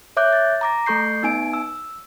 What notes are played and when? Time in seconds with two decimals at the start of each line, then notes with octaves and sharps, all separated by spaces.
0.17 C#5 E5 D6 F#6 G6
0.33 A6
0.61 A#5 D6 A#6
0.86 A3 A4 C#6 G6 C7
1.23 B3 D#4 G#5 D7
1.53 E6